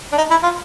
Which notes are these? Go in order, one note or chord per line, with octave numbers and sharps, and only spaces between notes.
D4
D#4
E4
F4